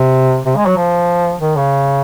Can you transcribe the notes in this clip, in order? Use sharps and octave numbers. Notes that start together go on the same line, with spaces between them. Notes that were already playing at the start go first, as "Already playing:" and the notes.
Already playing: C3
C3
G#3
F#3
F3
D#3
C#3